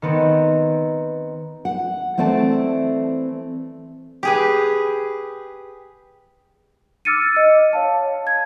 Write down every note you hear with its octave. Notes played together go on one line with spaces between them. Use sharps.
D#3 B3 C4
F#5
E3 A3 C4 D5 G#5 A5
G4 G#4 B4
D6 E6 F6 A6 C#7 D#7
D#5
C#5 F5 A5
G#6